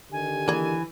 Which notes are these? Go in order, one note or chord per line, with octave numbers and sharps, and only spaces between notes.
D3 D#3 G4 G#5
E3 A#3 G#4